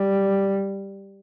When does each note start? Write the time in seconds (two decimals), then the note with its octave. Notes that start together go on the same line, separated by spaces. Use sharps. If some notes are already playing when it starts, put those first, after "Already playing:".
Already playing: G3